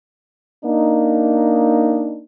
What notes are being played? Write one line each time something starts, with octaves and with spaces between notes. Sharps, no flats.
A#3 D4 D#4